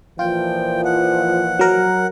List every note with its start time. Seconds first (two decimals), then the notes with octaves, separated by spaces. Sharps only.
0.19 A#2 E3 F3 F4 G5
0.85 F#5
1.59 F#3 A#4